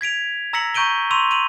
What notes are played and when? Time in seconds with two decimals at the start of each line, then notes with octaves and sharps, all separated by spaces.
0.01 G#6 B6 D7 F7
0.53 A#5 E6 A#6 B6 C#7 F#7
0.74 A#5 C#6 G6 D7 D#7 G7
1.11 C6 C#6 E6 D#7 F7
1.31 D#7 F7 F#7